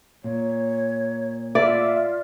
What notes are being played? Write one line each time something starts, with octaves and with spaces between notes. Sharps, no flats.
A#2 C#5
F4 D5 E5